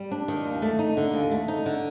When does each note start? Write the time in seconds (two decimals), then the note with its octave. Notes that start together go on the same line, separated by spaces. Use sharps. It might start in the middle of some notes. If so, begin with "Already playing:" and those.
Already playing: G3
0.11 D4
0.28 D#3
0.45 D#2
0.62 A3
0.79 D#4
0.97 D3
1.13 D#2
1.31 A3
1.48 D#4
1.66 D3